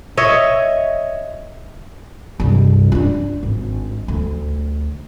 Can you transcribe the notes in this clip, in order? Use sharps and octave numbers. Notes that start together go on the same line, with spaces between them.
C#5 D#5 E5
C2 G2
D4 D#4
G#1
D2